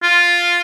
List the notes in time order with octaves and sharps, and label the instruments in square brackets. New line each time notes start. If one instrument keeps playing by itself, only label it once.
[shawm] F4